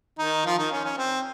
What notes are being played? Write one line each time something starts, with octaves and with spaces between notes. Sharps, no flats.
D#3 D#4
F3 F4
D#3 D#4
C#4
C#4
C4